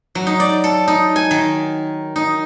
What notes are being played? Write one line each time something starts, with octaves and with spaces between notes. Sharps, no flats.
F#3
D#4
D5
A4
D#4
G#5
D#3
D#4